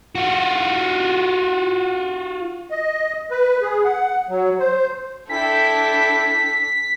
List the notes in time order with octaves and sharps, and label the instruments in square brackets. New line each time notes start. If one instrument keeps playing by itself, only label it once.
[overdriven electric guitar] F4 F#4
[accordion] D#5
B4
G#4
F#5
F#3
C5
[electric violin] D4 A4 [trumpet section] E4 G5 A5 [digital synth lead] B6